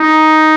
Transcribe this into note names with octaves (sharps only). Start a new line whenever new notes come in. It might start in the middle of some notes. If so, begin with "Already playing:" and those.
Already playing: D#4